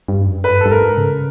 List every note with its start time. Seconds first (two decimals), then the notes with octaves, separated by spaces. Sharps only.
0.08 G2
0.27 F#2
0.44 G2 B4
0.61 G2 A4
0.71 G#2 A#4
0.97 C#3